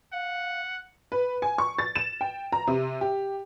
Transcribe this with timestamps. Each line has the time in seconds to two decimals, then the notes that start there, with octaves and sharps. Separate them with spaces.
0.13 F5 F#5
1.12 B4
1.42 G#5
1.58 C#6
1.79 A6
1.96 E7
2.21 G5
2.52 A#5
2.68 C3
3.01 G4